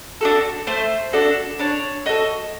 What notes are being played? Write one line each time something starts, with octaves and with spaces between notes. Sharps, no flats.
D4 F#4 A4
A3 C5
D4 F#4 A4
D4 C#5
F#4 A4 D#5